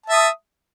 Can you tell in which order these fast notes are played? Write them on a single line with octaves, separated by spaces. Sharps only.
A5 E5 D#6